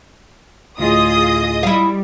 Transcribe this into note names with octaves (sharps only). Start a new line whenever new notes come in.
D2 A2 F4 G#4 D#5 D#6
G3 E4 F5